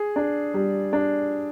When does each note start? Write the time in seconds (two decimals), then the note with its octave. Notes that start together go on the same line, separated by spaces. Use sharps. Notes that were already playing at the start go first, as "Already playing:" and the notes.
Already playing: G#4
0.16 D4
0.54 G3
0.93 D4